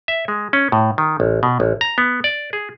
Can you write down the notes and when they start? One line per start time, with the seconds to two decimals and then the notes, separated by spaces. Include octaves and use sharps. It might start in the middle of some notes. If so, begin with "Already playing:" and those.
0.08 E5
0.28 G#3
0.53 C#4
0.72 A2
0.98 D#3
1.20 A1
1.43 B2
1.60 A1
1.81 A#5
1.98 B3
2.24 D5
2.53 G#4